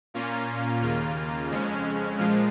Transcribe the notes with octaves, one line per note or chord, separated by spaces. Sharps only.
A#2 A#3 C#4 F4
D#2 C#3 A#3 F4
F2 C#3 G#3 C#4
A#2 F3 G#3 F4